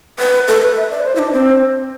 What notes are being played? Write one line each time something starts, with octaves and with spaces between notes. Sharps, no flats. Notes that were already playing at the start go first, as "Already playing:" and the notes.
B4
A4
B4
E5
D5
B4
C5
E4
D4
C4